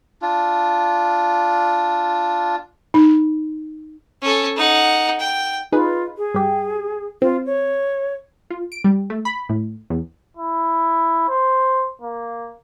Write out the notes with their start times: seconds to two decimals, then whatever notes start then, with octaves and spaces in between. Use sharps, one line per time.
0.22 D4 F4
2.94 D#4
4.22 C#4 A4
4.57 D#4 F#5
5.20 G5
5.72 D#4 F4 G#4 B4
6.18 G#4
6.34 G2 G4
7.22 C4 F4
7.46 C#5
8.50 F4
8.72 D7
8.84 G3
9.10 A3
9.25 B5
9.49 A2
9.90 E2
10.37 E4
11.28 C5
12.02 A#3